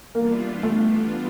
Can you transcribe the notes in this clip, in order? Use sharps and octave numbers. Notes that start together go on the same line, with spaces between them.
E3 G3 A#3 B3 D4 F4
A3